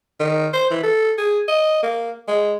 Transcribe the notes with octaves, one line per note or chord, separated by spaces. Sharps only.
D#3
C5
E3
A4
G#4
D#5
A#3
G#3